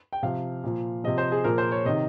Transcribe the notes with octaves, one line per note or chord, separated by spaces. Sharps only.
G5
C3 F3 F5
A#2 F3
C3 F3 D#5
C5
G#4
A#2 F3 A#4
C5
C#5
C3 D#3 D#5